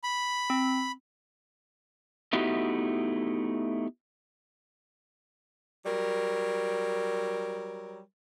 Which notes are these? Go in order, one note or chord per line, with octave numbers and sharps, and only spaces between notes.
B5
C4
A3 B3 D#4 E4 F#4 G4
F#3 G3 A#4